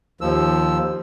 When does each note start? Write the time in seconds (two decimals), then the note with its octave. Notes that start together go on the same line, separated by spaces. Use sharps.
0.21 D#2 F3 E6